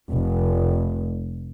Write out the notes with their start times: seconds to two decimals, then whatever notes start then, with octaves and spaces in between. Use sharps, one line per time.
0.11 F1